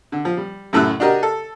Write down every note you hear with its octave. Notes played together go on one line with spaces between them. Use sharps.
D3
F3
G3
F#2 A2 A3 E4 E6 F#6
D4 F#4 G4 A#4 D#5
A4